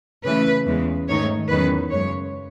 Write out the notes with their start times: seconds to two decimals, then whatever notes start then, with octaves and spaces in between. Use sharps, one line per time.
0.24 C#3 E3 A3 B4
0.66 E2 C#3 G#3
1.08 G#2 D#3 A3 D#4 C#5
1.50 E2 D#3 F#3 C#4 B4
1.92 F#2 C#3 G#3 C#5